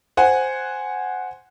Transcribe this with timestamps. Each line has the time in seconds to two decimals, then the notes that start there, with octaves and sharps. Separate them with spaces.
0.17 C5 F#5 G#5